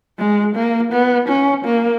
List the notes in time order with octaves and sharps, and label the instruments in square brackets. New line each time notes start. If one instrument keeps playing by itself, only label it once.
[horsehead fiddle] G#3
A#3
B3
C#4
A#3